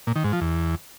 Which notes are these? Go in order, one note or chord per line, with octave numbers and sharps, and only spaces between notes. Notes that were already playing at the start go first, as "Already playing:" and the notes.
A#2
D#3
G#2
F3
E2